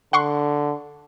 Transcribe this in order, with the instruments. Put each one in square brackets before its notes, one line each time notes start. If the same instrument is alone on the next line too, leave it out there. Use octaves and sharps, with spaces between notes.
[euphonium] D3 [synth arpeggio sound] F#5 C6 C#6